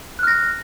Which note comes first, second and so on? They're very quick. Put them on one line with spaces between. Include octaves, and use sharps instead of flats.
F#6 F6 A#6